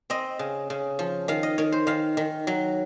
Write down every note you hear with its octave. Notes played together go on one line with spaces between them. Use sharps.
C4 D#5
C#3
C#3
F3
D#3 F5
D#5
D#3 C#5
C5
D#3 F5
D#3
F#3